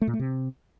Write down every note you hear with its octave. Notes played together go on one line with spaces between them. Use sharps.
A3
A#2
A3
C3